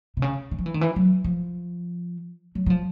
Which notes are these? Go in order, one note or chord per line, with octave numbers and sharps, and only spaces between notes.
C3
C#3
D#3
F3
E3
D#3
E3
F#3
F3
F#3
F#3
F3